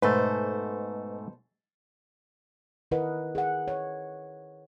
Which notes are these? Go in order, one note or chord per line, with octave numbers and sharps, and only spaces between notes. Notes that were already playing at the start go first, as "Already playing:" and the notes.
G#2 B2 A3 A4 B4 C5
D#3 E4 A#4 B4 D#5 F#5
G#4 F#5
C#5